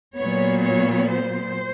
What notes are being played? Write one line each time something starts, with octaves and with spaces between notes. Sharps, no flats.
A#2 F#3 B3 C#5
C#5
C5